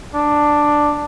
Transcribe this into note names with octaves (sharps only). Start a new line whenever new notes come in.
D4